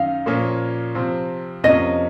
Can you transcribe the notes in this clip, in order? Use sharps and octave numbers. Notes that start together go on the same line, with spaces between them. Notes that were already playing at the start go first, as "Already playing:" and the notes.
Already playing: F#2 D#3 D#4 F5
A#2 F3 A#3 C#4 F4
C3 F3 C4 F4
F2 C3 F3 A#3 C#4 D#5